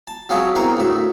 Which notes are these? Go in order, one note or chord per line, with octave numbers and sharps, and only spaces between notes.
A5
F#3 C4 F4 G#4 C#5 E5
E2 C4 A#4 C5 A#5 C#6
D2 A2 E5